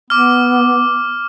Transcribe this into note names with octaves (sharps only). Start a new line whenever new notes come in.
B3 D6 F6